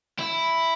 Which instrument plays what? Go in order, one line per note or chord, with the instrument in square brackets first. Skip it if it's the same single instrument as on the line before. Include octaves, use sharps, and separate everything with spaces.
[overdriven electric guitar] E4